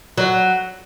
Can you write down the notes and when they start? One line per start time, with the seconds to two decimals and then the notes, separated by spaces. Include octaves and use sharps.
0.18 F#3